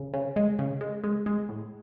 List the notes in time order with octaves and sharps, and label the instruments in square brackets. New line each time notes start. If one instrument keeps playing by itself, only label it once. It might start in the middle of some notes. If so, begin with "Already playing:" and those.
Already playing: [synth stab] C#3
C#3
G#3
C#3
G#3
G#3
G#3
A2